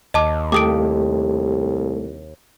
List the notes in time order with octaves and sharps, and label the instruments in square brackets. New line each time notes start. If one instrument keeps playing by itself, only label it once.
[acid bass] D#2 [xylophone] D#5 A5 D6
[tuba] C2 [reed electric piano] A3 G4 A4 [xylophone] D6 D#6 D7